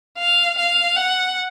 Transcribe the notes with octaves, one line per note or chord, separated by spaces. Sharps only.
F5
F5
F#5